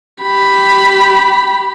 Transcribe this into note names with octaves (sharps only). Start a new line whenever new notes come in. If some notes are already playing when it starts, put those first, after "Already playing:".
G4 B5